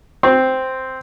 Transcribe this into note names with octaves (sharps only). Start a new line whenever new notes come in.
C4